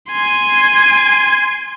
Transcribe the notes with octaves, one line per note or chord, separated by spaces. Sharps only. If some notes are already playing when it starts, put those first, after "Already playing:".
G#5 C6